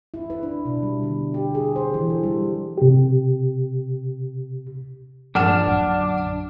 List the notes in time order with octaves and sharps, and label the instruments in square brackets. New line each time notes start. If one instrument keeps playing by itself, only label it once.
[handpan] E4
B4
D4
B2
G3
D3
G4
G#4
C5
E3
A4
G3
[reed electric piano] C3 G4
[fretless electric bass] G2 A#2 F3 [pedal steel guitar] D4 [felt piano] F#5 F6 E7
[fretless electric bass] A#1 F#2 D3